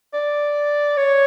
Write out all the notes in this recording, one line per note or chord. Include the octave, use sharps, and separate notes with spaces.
D5
C#5